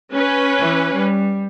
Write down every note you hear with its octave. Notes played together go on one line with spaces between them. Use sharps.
C#4 B4
E3
G3